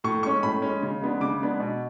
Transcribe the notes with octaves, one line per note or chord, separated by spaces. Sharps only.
A2 C#6
G#3 C#4 C#6
A2 B5
G#3 C#4
C#3
G#3 B3 D4
C#3 D6
G#3 B3 D4
B2